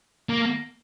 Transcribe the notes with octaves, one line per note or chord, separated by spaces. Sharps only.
A#3